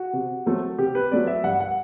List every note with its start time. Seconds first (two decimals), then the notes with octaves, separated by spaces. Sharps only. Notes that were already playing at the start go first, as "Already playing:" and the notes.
Already playing: F#4
0.13 C3
0.46 F#3 A3 C4
0.78 C3 G4
0.95 B4
1.11 F#3 A3 C4 D5
1.27 E5
1.44 G2 F#5
1.60 F#5